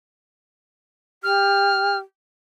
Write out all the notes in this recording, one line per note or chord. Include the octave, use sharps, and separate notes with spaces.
G4 F6